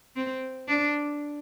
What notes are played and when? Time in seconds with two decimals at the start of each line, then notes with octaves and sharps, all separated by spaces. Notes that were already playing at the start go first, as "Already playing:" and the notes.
0.16 C4
0.68 D4